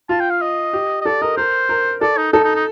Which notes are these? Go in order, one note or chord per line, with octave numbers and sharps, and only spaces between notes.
F4 A5
G5
F5
D#5
G4
D#5
A4 D5
A#4 D#5
A#4 C5
A#4
A4 D5
D#4
D#4 A4
D#4
D#4